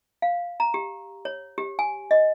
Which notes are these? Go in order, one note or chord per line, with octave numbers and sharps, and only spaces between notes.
F5
A#5
G4
C#5
G4
G#5
D#5